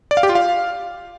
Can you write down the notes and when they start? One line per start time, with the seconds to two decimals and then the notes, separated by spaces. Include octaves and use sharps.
0.11 D5
0.17 F5
0.23 G4
0.29 F4
0.35 F5